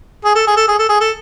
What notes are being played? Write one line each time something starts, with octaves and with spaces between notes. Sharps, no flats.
G#4
A4
G#4
A4
G#4
A4
G#4
A4